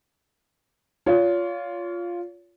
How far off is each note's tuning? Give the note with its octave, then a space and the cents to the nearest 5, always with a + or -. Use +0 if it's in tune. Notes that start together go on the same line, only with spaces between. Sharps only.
F4 +0 C#5 +35